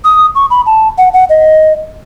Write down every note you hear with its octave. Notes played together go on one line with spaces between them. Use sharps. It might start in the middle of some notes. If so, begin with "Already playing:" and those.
D#6
C#6
B5
A5
F#5
F#5
D#5